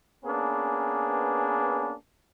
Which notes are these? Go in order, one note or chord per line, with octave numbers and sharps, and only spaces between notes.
A#3 B3 C#4 D4 G#4 B4